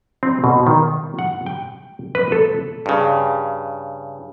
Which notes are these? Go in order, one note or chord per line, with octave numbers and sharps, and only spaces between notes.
C4
B2
D#3
F#5
G5
B4
A4
G2 C#3